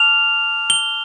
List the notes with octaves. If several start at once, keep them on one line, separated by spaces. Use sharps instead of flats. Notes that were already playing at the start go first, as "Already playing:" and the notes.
Already playing: A5 D6 F6 F7
G7